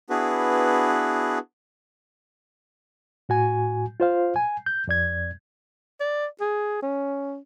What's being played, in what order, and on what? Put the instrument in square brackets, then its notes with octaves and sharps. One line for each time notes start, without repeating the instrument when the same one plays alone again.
[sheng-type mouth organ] B3 D4 E4 F#4 G#4 B4
[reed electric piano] A2 F#4 G#5
F4 C5 F5
G#5
G6
F2 D5 G#6
[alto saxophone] D5
G#4
C#4